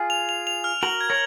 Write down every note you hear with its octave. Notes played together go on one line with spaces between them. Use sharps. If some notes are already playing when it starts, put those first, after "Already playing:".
Already playing: F4 G#4
F7
F7
F7
F6
F#4 A#4 F#7
G#6
A#4 C#5